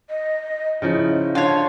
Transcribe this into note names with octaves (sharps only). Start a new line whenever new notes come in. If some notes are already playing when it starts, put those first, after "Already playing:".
D#5
C#3 F3 D#4 E4
D3 F4 C#5 A5